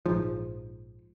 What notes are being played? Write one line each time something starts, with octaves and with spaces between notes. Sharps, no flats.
A#1 G#2 F3